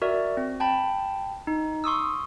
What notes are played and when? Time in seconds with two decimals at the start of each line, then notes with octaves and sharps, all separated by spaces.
0.02 F#4 A#4 D5 E5
0.37 C4
0.60 G5 A5 B5
1.47 D#4
1.84 C6 C#6 D#6 E6